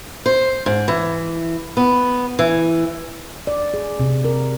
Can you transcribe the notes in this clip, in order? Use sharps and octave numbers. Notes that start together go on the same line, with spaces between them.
C5
G#2
E3
B3
E3
D5
G#4
C3
A#4